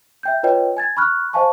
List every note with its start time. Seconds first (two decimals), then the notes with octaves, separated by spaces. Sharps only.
0.23 E5 G5 G6
0.43 F4 B4 C#5 D#5 G5
0.77 G#5 G#6 A6
0.97 B5 C#6 F6 F#6
1.33 C5 D#5 F5 G#5 A5 C#6